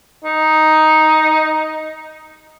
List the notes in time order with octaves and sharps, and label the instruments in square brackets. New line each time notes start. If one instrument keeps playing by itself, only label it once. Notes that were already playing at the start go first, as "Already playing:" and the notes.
[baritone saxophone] D#4